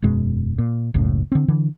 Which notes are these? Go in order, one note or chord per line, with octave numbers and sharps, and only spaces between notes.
E1 F#2 B2 G#3
A#2
F#1 C#2 A2
D3 C4
D3 E3